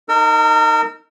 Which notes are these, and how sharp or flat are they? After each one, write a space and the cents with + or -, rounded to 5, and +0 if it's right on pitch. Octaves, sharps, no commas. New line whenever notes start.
D#4 +0 A#4 -30 E6 +0